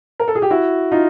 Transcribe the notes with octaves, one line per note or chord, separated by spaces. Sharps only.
A#4
A4
G#4
G4
E4 F#4
D#4 F4